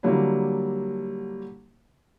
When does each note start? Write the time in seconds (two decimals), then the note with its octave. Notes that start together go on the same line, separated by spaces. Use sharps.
0.03 D3 F#3 G3 A#3 D4 E4